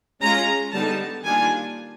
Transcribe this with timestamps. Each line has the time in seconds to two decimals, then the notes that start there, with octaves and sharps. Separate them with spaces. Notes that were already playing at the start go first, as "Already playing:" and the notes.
0.22 G#3 C#4 F4 A#5
0.73 D3 G3 B3 D#4 A5
1.23 D#3 G3 A#3 D4 F4 G#5